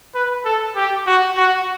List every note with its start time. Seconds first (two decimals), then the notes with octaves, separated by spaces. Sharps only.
0.15 B4
0.45 A4
0.76 G4
1.06 F#4
1.37 F#4